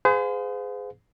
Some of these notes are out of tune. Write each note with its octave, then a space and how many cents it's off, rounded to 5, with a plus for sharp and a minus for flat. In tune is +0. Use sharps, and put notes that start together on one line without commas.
G#4 +0 C5 -45 F5 +35